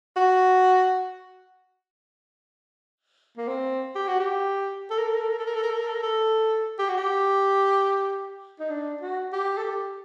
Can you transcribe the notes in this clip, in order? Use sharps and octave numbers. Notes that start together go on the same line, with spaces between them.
F#4
A#3
C4
G4
F#4
G4
A4
A#4
A4
A#4
A4
A#4
A4
A#4
A4
A#4
A4
A#4
A4
A#4
A4
G4
F#4
G4
D#4
D4
F#4
G4
A4
G4